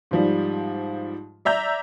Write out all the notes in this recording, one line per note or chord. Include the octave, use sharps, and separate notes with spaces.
G#2 F3 G3
D5 E5 A#5 G6